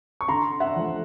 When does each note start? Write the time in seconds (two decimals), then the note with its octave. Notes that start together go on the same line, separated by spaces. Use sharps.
0.21 C#6
0.28 D3 A#5 C6
0.60 E5 F#5
0.76 F3 A3